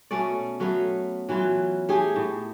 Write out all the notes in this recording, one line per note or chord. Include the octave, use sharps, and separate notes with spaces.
B2 A3 C#4 D5
F#3 A3 B3 F5
E3 F#3 E4 F4
A3 D#4 G4 G#4
A2